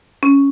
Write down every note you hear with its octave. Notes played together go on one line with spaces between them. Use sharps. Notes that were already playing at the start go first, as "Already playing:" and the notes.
C#4